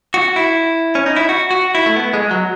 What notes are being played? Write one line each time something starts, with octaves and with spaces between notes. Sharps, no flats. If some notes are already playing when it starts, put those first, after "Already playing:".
F#4
E4
C#4
D#4
E4
F#4
F#4
E4
A3
B3
G#3
F#3